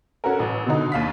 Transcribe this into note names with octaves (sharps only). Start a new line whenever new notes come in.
C#4 F#4 A4 A#4
A1
B2 D3 D#4
D#2 F5 B6